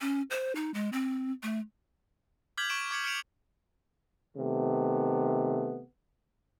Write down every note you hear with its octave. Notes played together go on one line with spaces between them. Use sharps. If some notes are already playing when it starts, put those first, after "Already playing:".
C#4
C5
D#4
G#3
C4
A3
D6 F6 G6 G#6 B6 F#7
C#6 D7 E7
D6 G#6 C#7 F#7
F6 G6 C#7 D7 E7 F7
C3 D#3 A3 B3